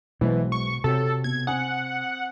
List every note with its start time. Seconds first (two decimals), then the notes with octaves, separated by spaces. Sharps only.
0.21 B1 B2 E3 G#3 C5
0.52 C#6
0.84 C3 F#4 G4 A4 C#5
1.24 B2 G#6
1.47 C4 F#5 G#5 D#6